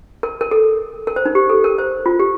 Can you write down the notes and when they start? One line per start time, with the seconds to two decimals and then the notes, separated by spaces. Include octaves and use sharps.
0.23 A#4
0.41 A#4
0.51 A4
1.07 A#4
1.16 C5
1.25 D#4
1.35 G4
1.49 A4
1.64 A#4
1.78 C5
2.06 F4
2.20 G4